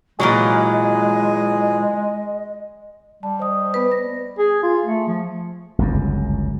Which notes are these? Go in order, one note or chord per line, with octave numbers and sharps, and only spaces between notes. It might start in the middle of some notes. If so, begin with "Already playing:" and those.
A#2 E3 F#3 G#3 G#4 D#5
G3 A5
C5 D#5 D#6
B3 B4
A#6
G#4
F4
A3
F3
G1 C#2 F#2